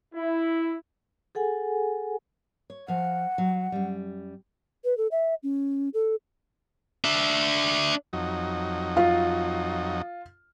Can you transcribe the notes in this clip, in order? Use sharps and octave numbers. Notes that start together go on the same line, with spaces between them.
E4
G#4 A4 F#5 G#5
C#5
F3 F5 F#5
F#3
F#2 G3
B4
A4
E5
C#4
A4
D4 E5
F2 F#3 D#4
F4